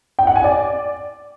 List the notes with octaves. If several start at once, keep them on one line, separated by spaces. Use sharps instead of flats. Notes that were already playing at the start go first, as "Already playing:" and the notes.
G5
F#5
G#5
D5